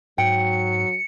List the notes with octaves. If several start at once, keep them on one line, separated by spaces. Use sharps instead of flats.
G#2 F#3 G5 C#7